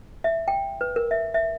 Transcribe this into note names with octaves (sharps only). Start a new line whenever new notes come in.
E5
G5
B4
A#4
E5
E5